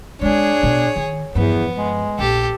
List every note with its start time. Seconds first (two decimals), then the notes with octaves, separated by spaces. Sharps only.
0.21 G#3 C4 D4 G#4 C#5
0.63 B2 B3
0.96 D#3
1.35 E2 G2 F3 B3
1.76 G#3
2.19 A#1 G4 A4